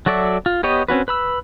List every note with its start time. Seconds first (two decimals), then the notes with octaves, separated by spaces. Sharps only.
0.06 F#3 F#4 A4 D5 E5
0.46 F4
0.63 B3 G4 C#5 D#5
0.88 C4 C#4 F#4 B4
1.08 B4 B5 E6